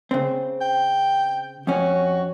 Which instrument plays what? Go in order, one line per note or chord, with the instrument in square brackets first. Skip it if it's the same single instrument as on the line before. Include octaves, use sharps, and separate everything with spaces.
[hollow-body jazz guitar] C#3 C4
[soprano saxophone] G5
[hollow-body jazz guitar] F2 C#4 [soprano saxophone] F#4